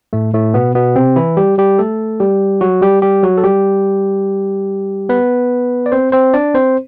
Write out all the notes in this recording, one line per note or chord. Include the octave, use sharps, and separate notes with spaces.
A2 A3
A2 A3
B2 B3
B2 B3
C3 C4
E3 E4
G3 G4
G3 G4
A3 A4
G3 G4
F#3 F#4
G3 G4
G3 G4
F#3 F#4
A4
G3 G4
B3 B4
D5
C4 C5
C4 C5
D4 D5
C4 C5